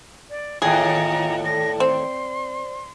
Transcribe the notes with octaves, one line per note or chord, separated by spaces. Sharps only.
D5
D#2 A2 F4 G#4 D#5 F5 A#5
A4 D5 A5 A#6
C4 C5 D5 C6